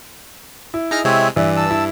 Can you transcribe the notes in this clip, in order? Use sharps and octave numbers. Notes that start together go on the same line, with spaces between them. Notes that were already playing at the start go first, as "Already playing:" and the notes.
E4
D#4 G#4 D#5 A#5 F6
C3 G#3 C4 C#5 E5
G2 E3 D5 E5
A5 E6
E4